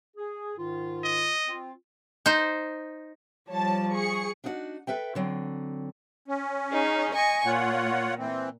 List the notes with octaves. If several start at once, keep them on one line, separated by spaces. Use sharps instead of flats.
G#4
G#2 D#3 F4
D#5
C4 F4
D#4 C5
F3 G3 C#5 A5
G#4 C#6 C#7
D4 D#4 F#4 D5 F#5
A4 B4 E5 G5
D3 F#3 C4
C#4
D#4 G#4
D#5 G#5 C#6
A#2 F4 C#5 F#5
E3 C4